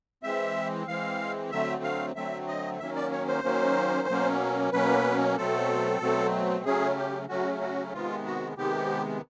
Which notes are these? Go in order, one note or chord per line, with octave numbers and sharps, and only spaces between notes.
E3 G#3 C4 E5
E3 G#3 C4 F5
D3 F#3 A3 C4 E5
F5
D3 F#3 A3 C4 E5
D#5
D#3 F#3 A#3 C#4 E5
D5
C#5
C5
D#3 F#3 A#3 C#4
B2 F#3 A#3 C#4
B2 F#3 A#3 C#4 B4
B2 F#3 A3 C4 A4
B2 F#3 A3 C4
C#3 F#3 A3 C#4 G#4
G4
C#3 F#3 A3 C#4 F#4
F#4
C3 D#3 G#3 B3 F4
F#4
C3 D#3 G#3 B3 G4